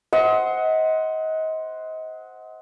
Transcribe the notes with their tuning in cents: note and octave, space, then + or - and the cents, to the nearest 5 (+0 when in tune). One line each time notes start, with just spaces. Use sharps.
C5 -5 D#5 +30 F#5 +0